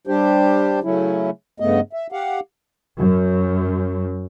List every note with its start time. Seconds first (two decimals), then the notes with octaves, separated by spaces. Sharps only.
0.07 G3 D4 G4 C5
0.83 C#3 F#3 A3 C#4 E4
1.60 G2 C#3 A3 B3 D#5
1.93 E5
2.12 G4 F5 F#5
2.99 F#2